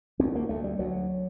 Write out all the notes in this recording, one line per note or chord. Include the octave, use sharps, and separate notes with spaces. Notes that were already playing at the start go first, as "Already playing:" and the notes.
D2 C4
A#3
D2 A3
G3
D2 F#3